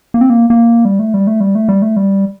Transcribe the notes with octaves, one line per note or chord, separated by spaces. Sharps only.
A#3
C4
A#3
A#3
G3
A3
G3
A3
G3
A3
G3
A3
G3